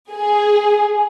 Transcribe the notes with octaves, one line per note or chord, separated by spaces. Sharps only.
G#4